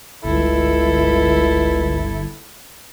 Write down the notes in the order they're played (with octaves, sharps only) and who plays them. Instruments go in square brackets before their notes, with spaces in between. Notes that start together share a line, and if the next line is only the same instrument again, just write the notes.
[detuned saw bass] G1 [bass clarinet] C#2 [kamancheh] E4 A4